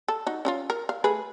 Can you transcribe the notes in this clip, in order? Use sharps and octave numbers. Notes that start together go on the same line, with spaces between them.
A4
D#4 F#4
C#4 D#4 F4
A#4
F5
A3 G#4 B4